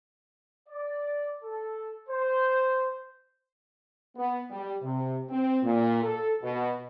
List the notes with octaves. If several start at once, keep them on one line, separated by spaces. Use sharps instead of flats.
D5
A4
C5
B3
G3
C3
C4
A#2
A4
B2